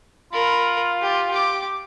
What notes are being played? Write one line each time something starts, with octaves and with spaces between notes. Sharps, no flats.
F4 A#4 B5
G4
G4 D6